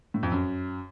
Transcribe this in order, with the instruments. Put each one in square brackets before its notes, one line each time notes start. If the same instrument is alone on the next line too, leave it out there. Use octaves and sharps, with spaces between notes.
[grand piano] A2
F2
F#2